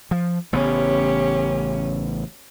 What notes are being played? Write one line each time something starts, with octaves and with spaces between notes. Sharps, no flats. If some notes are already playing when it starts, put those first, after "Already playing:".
F3
A1 C#3 B3 C#4 G4